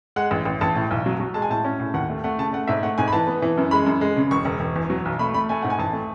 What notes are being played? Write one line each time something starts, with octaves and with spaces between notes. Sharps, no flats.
G#3 F#5
A1
A1
A1 A5
A2
B1
F#3
F#3
G#3 A5
G#5
A2 A5
C#4
A2
D#2 F#5
A3
A3 F#5
C#3 A5
A3 F#5
G#2 E5
A3 F#5
G#2 G#5
B5
E3 A5
B3
E3
F#2
G#3 B5
F#2
G#3
C#3
E1 C#6
E1
E1
E2
F#3
B1
A3 B5
A3 B5
A3 G#5
G#2 F#5
G#5
A1 A5
A3